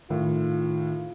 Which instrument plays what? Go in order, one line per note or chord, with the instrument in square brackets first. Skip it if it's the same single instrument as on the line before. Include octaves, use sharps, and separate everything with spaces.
[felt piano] A2 [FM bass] D#3 [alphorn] F4